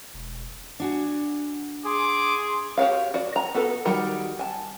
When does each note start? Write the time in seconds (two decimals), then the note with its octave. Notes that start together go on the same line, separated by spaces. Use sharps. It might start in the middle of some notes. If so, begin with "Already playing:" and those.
0.14 E1
0.80 D4 F#4 G#5
1.86 G#4 C6 D6
2.77 F#4 G4 C#5 F5
3.14 F#4 D5
3.36 A#5
3.54 B3 F#4 A4 B4
3.85 D#3 F#3 G3 F#4 A#4
4.39 G#5 A5